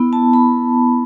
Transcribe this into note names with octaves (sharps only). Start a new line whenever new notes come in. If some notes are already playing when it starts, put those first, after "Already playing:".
Already playing: B3 E4 B5
A5
B5